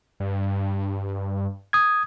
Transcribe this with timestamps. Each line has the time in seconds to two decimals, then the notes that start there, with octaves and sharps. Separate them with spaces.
0.20 G2
1.73 D#6 G#6